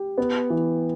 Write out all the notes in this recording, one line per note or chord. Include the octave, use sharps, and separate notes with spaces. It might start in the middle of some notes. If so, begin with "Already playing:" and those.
Already playing: G4
B3
E3